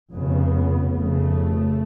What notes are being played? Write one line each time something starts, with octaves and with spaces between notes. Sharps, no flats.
F1 F2 C#3 B3
F1 F2 C#3 A3